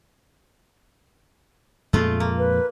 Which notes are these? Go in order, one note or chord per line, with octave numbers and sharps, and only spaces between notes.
F2 A#2 G#3 A3 F4
A#3
B4